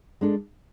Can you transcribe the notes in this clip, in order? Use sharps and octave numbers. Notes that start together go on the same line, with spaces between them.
G#3 D4 A4